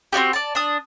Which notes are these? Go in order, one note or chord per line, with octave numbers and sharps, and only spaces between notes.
C4 D4 F#4 G4
D5 A5
D4 D#6